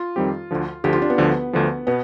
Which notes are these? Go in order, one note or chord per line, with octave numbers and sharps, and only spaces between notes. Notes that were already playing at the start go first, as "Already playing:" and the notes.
Already playing: F4
F2 D#3 G3 C4 G4
D2 D3 F3
D2 D3 F3 G4
F4
D4
B3
D2 D3 F3
D2 D3 F3
B2 B3